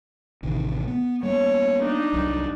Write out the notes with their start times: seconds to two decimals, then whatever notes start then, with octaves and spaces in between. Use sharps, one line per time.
0.43 A1 C3 D#3
0.87 B3
1.23 G3 A#3 B3 C#5
1.82 D4 D#4
2.13 F1 C2 F#3